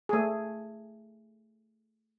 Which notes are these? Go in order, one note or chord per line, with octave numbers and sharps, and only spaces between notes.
A3 G#4